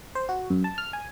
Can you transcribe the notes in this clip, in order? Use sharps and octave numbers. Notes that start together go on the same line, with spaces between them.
C5
F#4
F#2
A5
F6
G#5